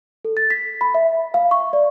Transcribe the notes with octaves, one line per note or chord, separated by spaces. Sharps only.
A4
A6
B6
B5
E5
F5
C#6
D5